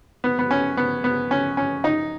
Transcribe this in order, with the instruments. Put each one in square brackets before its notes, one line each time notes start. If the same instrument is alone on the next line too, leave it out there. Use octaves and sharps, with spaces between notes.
[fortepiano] B3
B3
C#4
B3
B3
C#4
C#4
D#4